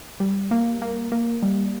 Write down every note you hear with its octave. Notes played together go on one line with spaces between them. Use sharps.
G3
A#3
A#3
A#3
G3